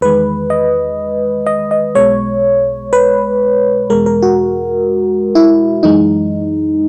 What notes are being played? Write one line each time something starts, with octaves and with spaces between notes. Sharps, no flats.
E2 D#3 G#3 B4
D#5
D#5
D#5
B1 B2 G#3 C#5
B4
E2 B2 G#3 A#4
A#4
F#4
E4
F#2 E3 G#3 D#4